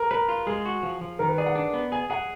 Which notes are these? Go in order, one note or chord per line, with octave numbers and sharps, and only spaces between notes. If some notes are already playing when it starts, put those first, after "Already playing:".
Already playing: A#4
A#4 B4
F4
G#3 G#4
F#4
F3
F3
D#3 A#4
B4
G#4 D5
F#5
D4
B3
G#4 G#5
G#4 F#5